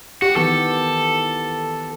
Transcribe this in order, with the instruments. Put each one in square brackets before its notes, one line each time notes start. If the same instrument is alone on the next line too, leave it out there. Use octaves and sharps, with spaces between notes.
[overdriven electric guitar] F#4 [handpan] G4
[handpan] D#3 E3 B3 [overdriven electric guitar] A4